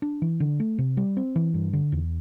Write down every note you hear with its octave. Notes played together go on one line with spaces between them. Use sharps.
D4
E3
D3
A3
C3
G3
C4
E3
G2
D3
E2